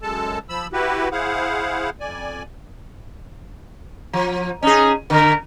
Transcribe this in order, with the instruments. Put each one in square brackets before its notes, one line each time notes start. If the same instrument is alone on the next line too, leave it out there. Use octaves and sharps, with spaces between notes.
[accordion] F#2 G#3 A4 A5
F3 B5 E6
E4 F#4 G4 B4
E4 G#4 C5 F5 F#5
F2 D5 G#5
[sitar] F3
[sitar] C#4 G#4 [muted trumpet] D#4
[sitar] D3 [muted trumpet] A#4